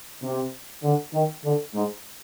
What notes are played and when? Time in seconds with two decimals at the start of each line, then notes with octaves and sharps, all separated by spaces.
0.22 C3
0.83 D3
1.13 D#3
1.44 D3
1.74 G#2